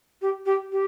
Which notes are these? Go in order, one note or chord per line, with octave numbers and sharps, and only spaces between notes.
G4
G4
G4